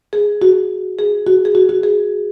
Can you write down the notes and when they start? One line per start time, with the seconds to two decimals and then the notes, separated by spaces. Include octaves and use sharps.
0.13 G#4
0.42 F#4
0.99 G#4
1.26 F#4
1.45 G#4
1.55 F#4
1.69 F#4
1.83 G#4